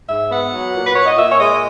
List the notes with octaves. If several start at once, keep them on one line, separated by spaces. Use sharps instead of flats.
G#2 E5
B3 F#5
F#3
A#2
B4
A#2 C#5
D#5
A#2 E5
C#5
G#3 D#5
D#5